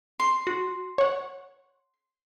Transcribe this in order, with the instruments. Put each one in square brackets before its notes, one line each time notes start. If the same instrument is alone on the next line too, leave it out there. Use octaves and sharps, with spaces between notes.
[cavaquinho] C6
[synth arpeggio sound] F#4
C#5 F#5